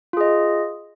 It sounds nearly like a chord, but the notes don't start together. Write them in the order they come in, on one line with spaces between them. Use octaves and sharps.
F4 G#4 D#5